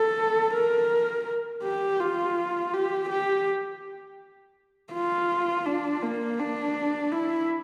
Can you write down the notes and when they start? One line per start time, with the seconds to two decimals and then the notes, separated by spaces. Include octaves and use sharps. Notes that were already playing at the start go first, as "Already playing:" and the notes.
Already playing: A4
0.54 A#4
1.64 G4
2.00 F4
2.74 G4
3.10 G4
4.93 F4
5.66 D4
6.02 A#3
6.39 D4
7.12 E4